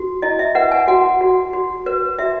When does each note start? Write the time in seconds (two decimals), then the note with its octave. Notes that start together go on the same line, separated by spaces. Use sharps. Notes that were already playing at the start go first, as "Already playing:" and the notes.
Already playing: F#4
0.22 E4 D#5
0.39 E5
0.55 B4 F#5
0.72 G#5
0.88 F#4 F#5
1.21 F#4
1.53 F#4
1.86 B4
2.18 F#4 E5